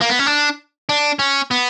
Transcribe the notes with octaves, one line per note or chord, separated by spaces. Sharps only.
A#3
B3
C#4
D4
D4
C#4
B3